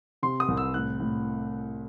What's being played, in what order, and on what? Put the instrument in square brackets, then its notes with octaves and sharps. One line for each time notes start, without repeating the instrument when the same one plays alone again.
[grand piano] C3 C6
D#6
C2
E6
A2 F#6
A2